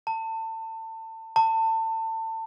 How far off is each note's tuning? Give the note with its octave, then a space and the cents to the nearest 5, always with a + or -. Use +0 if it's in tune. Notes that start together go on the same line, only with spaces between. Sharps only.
A5 +30
A5 +30